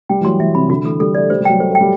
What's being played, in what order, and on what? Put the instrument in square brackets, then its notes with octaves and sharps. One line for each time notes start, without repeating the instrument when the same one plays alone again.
[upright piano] G3 [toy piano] G5
[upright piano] E3
[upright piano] F#3 [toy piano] C6
[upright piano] E3 [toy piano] E5
[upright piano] C3 [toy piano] B5
[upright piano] D3 [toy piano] F#4
[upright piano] E3 [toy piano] A4
[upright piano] G3 [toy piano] A4
[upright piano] A3 [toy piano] D5
[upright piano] G3 [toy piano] C5
[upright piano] G3
[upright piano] F#3 [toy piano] G5
[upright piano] A3 [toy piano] C5
[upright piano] A3
[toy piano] G5
[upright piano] G3